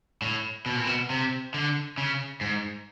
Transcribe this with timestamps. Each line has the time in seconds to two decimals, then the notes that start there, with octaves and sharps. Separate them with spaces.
0.22 A2
0.66 B2
0.76 A#2
0.87 B2
1.10 C3
1.54 D3
1.98 C#3
2.41 G#2